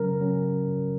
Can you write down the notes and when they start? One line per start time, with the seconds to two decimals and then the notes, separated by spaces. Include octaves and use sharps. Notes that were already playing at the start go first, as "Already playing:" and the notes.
Already playing: C#3 F#3 C#4 A#4
0.21 C#3 F#3 C#4